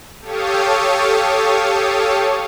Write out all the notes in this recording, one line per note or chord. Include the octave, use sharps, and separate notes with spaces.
G4 A4 C#5 F5 C#6 D#6